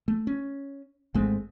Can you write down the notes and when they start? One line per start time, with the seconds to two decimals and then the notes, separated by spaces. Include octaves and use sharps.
0.08 A3
0.27 C#4
1.14 G#1 G#3 A3 C4